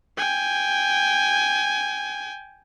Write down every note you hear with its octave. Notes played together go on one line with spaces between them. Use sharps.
G5 G#5